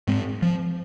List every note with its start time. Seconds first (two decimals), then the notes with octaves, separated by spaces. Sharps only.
0.08 G#2 G#3 C4
0.42 F3